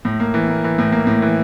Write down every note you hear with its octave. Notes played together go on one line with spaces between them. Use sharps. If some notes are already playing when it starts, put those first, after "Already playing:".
A2
A#3
E3
A#3
E3
A2
A#3
A2
E3